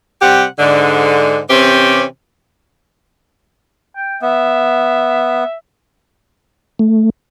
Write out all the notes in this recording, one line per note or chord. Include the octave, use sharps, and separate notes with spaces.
C3 G3 G4 F#5
G#2 D3
C3 E3 C4 C#4 G4
G5
B3 E5
A3